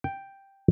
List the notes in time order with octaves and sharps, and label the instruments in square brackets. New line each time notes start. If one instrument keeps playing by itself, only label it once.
[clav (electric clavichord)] G5